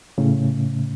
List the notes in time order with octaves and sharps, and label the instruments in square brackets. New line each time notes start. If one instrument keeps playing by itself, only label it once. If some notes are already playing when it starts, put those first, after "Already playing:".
[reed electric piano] A2 C#3